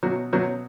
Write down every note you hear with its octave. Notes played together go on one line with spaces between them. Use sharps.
B2 F#3 F#4
B2 F#3 F#4